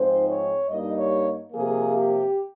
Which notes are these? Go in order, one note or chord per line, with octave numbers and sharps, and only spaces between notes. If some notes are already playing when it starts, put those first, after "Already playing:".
Already playing: G#2 F3 C4 D#4 C5
C#5
G2 G3 A#3 D#4 D#5
C#5
C3 F3 A#3 G#4
G4